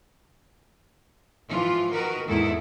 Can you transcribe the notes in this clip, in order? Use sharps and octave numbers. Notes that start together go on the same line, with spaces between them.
G#2 E3 F3 F4
D#3 F#4 A#4 B4
E2 G#2 D#3 A#3 E4 A4